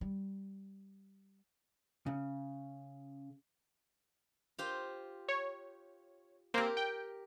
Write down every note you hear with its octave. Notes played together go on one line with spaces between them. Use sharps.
G3
C#3
F4 G4 C5
C#5
A#3 C4 G4 A#4
G5